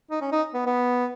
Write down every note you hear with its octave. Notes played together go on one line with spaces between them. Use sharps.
D#4
C#4
D#4
B3
B3